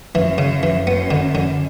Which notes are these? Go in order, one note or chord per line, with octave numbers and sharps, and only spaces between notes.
F#2 E3
C#3
E3
F#2 B3
D3
D3